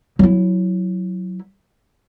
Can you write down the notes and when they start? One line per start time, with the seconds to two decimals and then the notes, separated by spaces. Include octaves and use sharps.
0.19 F#3 E4